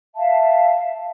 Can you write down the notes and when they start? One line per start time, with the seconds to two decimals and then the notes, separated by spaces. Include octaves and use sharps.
0.15 E5 F5 A5